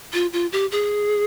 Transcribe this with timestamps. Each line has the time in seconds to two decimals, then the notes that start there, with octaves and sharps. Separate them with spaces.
0.13 F4
0.33 F4
0.52 G4
0.72 G#4